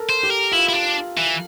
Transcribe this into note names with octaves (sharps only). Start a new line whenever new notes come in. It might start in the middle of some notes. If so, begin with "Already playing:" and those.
Already playing: A4 A#4
C5
G4
A#4
E4 F4
E4
D4
E3